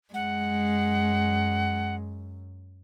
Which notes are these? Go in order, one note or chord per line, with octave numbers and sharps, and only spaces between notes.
F#2 G#3 F#5